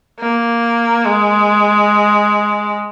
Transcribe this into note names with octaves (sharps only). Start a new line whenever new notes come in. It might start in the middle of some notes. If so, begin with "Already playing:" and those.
A#3
G#3